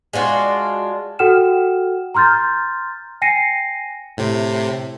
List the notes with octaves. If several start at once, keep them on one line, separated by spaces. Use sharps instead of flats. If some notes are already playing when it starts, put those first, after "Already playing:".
G#3 D4 F4 F#4
F#4 A4 F#5 G5 F6 E7
A#5 C6 F6 G6 A6
G5 G#5 A#6 C7 C#7 D#7
A2 C3